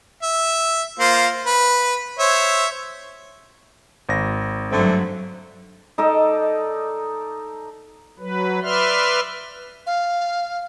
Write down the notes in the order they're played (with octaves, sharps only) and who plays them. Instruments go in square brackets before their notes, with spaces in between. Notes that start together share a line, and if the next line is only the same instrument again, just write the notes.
[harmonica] E5
A#3 F4 C5
B4
C5 C#5 E5
[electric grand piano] G#1 A#6
[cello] G2 F#3 [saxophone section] D3 A3 C4
[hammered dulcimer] D#4 A4 D5 D#5
[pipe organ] F#3 B4
B4 D5 E5 C6 F6
[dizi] F5